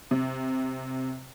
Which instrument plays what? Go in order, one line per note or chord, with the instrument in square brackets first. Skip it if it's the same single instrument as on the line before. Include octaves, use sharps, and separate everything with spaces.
[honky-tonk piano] C3